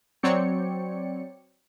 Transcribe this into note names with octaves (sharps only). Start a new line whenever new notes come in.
F#3 C4 C#5 D5 G5 C#7